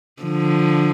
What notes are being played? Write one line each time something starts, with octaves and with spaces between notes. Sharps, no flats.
D3 F3